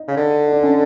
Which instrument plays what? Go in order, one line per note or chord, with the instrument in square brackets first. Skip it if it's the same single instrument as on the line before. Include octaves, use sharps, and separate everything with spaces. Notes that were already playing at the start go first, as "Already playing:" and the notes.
Already playing: [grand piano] D#4
[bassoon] C#3
D3
[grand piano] D#4
D4
C#4